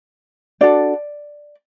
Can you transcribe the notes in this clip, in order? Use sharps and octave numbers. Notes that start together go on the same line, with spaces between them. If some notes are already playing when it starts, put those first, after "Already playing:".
D4 F#4 A4 D5